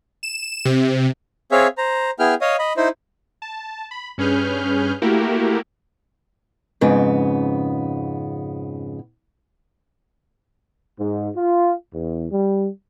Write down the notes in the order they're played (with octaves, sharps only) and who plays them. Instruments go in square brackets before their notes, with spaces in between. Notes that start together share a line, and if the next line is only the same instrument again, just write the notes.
[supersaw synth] E7
C3
[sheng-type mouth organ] C4 G#4 C#5 E5 F5
C5 A#5
B3 E4 G#4 G5 F6
C#5 D#5 F5 D#6
D#5 B5
D#4 E4 C5
[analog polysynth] A5
B5
G2 C#4 G#4 B4 F6 G6
A3 A#3 E4 F#4 G4 A#4
[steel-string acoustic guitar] F2 G#2 C#3 B3
[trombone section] G#2
F4
E2
G3